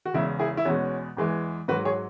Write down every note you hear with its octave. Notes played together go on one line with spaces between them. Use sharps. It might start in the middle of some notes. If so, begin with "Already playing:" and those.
F#4
E2 C#3 G#3 E4
E4 G#4
E4
E2 B2 G#3 C#4 F#4
E2 E3 G#3
G#2 F#3 F#4 B4
G#4 C#5